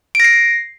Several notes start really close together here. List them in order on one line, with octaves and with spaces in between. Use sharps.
D7 A#6 C7